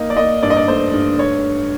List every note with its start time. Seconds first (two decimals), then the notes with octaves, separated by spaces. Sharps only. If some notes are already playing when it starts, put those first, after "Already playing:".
Already playing: A#3 D#4 D#5
0.10 D5
0.17 A#3 D#5
0.43 G2 D5
0.50 D#5
0.56 D5
0.68 A3 C5
0.94 G2
1.19 C#5